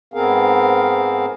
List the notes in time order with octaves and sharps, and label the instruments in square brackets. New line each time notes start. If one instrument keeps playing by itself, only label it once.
[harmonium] G#2 B3 C4 G#4 A#4 F5